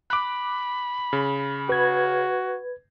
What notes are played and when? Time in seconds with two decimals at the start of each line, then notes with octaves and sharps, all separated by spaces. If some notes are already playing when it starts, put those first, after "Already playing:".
0.10 B5 D6 F#6
1.13 C#3
1.69 F#4 B4 G#6